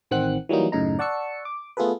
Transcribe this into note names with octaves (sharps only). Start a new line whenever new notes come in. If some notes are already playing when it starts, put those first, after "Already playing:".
A1 D#3 C4 F#5 F#6
E3 F#3 G3 A#3 D#4
F#2 A2 C#3 D#4 A#5
D5 F#5 A5 C#6 E6 C#7
D6
A3 B3 F4 G#4 A4 B4